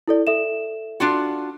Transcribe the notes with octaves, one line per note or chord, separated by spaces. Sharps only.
E4 A4 D5
A4 E5 E7
D4 F4 F#4